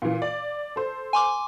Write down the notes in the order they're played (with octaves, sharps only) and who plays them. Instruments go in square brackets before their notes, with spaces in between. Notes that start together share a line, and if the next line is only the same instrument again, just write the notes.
[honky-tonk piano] A#2 E3
D5
A4 C5
[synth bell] G#5 C6 D6